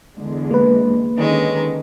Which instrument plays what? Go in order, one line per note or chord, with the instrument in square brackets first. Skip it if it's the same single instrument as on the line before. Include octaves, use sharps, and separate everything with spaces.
[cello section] E2 D3 G#3
[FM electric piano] A#3 B4
[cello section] D3 C#4 [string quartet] D#3 G#3